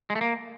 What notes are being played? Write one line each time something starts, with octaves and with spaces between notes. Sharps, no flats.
G#3
A3
A#3